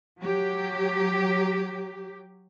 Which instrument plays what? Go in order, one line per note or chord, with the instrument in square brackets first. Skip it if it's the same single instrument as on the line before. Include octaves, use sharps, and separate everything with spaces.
[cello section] F#3 G4